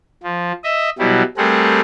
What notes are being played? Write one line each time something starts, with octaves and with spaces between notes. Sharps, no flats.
F3
D#5 E5
B2 F#3 G3 E4
G3 A3 C4 G#4 A#4 F#5